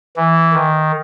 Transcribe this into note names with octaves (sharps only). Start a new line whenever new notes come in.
E3
D#3